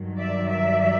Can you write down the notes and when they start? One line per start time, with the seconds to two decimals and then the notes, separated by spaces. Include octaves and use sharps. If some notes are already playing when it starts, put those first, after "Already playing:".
Already playing: G2 D#3 F#3
0.17 D5 E5
0.47 D5 E5